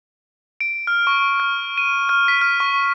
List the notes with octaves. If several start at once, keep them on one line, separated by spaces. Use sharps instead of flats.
D7
F6
C#6
F6
D#7
F6
B6
F6
C#6